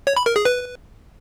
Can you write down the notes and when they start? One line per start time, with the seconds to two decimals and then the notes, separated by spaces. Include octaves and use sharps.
0.07 C#5
0.17 B5
0.26 A#4
0.36 G#4
0.45 B4